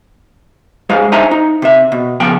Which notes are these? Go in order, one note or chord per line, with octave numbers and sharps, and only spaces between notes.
G#3 G#4 C5 F5
D4 D#4 C5 E5 G#5 A#5
D#4
C3 E5
B2
C#3 F3 B3 G5